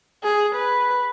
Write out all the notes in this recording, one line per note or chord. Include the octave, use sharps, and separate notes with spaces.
G#4
B4